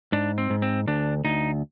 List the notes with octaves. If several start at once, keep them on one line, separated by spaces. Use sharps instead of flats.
G#2 D4
C4
G#2
C4
D2 D4
D2 D#4